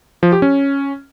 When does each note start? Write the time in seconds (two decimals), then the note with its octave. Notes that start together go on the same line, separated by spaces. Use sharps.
0.23 F3
0.32 G4
0.42 C#4